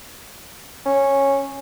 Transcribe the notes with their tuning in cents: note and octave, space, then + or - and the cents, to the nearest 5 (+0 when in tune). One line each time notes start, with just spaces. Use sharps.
C#4 -10